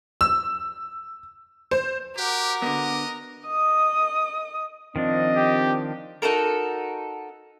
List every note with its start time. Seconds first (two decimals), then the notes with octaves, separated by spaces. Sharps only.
0.21 E6
1.71 C5
2.17 F#4 G4 A#4 F#5 D6
2.62 D3 B3 D#5
3.47 D#5 D#6
4.96 D#3 F3 C4 D4 D#5
5.36 G4
6.22 D#4 F#4 A4 A#4